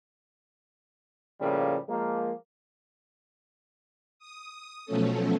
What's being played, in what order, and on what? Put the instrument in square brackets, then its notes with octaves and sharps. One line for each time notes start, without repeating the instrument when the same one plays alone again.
[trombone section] A2 C#3 F3 G3 A#3
F3 G#3 A#3
[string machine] D#6
B2 F3 F#3 A3 C#4 A4